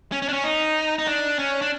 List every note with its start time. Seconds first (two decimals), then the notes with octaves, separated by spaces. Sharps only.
0.12 C#4
0.22 C#4
0.28 D4
0.33 C#4
0.44 D#4
0.99 D#4
1.07 D4
1.39 C#4
1.62 D4